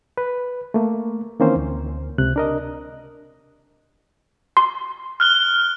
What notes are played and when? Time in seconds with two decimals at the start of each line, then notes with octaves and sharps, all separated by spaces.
0.18 B4
0.74 A3 A#3
1.40 D#3 E3 A#3 C4 C#4 C5
1.56 D2
2.18 C#2 C3 F#6
2.36 D4 A#4 D#5
4.57 C6
5.20 F6 F#6 G7